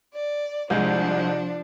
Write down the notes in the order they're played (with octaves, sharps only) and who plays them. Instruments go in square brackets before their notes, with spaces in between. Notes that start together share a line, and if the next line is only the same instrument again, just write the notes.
[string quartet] D5
[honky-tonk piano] C2 G#3 [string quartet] F3 D4